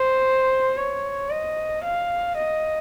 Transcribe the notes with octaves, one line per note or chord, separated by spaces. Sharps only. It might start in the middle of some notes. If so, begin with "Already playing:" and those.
Already playing: C5
C#5
D#5
F5
D#5